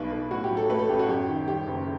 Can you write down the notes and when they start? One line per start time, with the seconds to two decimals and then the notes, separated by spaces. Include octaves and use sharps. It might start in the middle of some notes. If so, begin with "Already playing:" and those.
Already playing: B1 B2 G3 B4
0.11 B1
0.31 A2 F#4
0.44 G4
0.50 F#3
0.57 A4
0.70 A3 B4
0.79 A4
0.89 A1 G4
0.99 F#4
1.09 F#2 G4
1.28 D#3
1.48 G3 G4
1.67 F#1